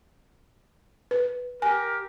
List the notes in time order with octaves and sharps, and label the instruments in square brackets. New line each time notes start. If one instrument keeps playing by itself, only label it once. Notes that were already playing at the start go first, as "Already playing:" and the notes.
[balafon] B4
[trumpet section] G4 A#4 [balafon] G#5